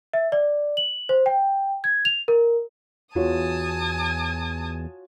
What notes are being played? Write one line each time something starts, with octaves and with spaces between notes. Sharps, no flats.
E5
D5
F#7
C5
G5
G#6
F7
A#4
E2 F4 F#4 C#5 G#5 A5 D#6